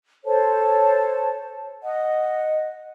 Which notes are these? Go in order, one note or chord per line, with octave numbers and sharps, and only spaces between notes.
A4 C5 C#5 A5
D#5 F#5